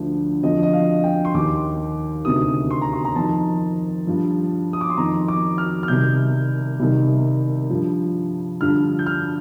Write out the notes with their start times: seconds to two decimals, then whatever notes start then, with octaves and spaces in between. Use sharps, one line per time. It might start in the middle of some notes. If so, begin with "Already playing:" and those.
Already playing: D2 D3 F3
0.43 F2 D3 F3 D#5
0.63 D#5
0.73 F5
1.04 G5
1.25 C6
1.34 D#2 D#3 D6
2.25 D2 C3 D#3 D#6
2.70 C6
2.81 A#5
2.93 C6
3.05 A#5
3.16 F2 D#3 A5
4.07 G2 F3
4.73 D#6
4.81 D6
4.90 C6
4.97 F2 D#3 A#5
5.28 D6
5.58 F6
5.83 F6
5.88 C2 C3 D#3 G6
6.79 C2 C3 D#3
7.70 G2 F3
8.61 G2 D3 F3 F6
8.99 G6
9.06 F6